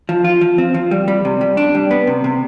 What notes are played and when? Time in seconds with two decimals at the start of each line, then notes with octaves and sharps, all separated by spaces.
0.09 F3
0.24 F4
0.41 F3
0.58 C4
0.74 F3
0.91 G3
1.08 G3
1.25 C3
1.41 G3
1.57 D4
1.75 G3
1.91 B3
2.07 C3
2.24 C3